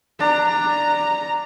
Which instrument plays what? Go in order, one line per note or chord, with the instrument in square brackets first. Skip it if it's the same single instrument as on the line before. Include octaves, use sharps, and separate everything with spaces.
[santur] D4 [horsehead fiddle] A#5